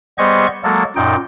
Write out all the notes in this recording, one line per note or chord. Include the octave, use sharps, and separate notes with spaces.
G3 B3 G#4 C5 D#5 C#6
F#3 G#3 A#3 A4
F#2 A#2 D#4 G5